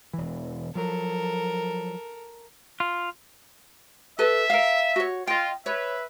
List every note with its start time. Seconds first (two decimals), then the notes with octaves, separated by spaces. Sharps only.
0.13 E1 E3
0.75 F3 F#3 A4 A#4
2.80 F4
4.19 A4 B4 E5
4.50 A#4 F5
4.96 F#4 C#5
5.27 F4 D#5 G5
5.66 B4 C#5 E5